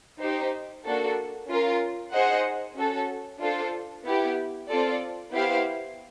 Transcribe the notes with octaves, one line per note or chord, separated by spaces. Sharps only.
D#4 G4 C5
A#3 D4 F#4 A4
C#4 F4 A#4
D#4 G#4 C5 D#5 F#5
C#4 F#4 A4
D4 F4 A4 C5
B3 E4 G4
C4 F4 A4 D5
B3 E4 G4 C5 F5